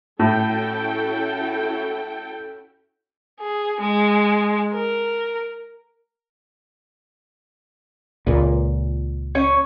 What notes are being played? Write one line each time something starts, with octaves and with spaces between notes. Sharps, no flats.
A2 C#4 E4 F#4 A4 G5
G#4
G#3
A#4
C#2 A#2
C#4 C#5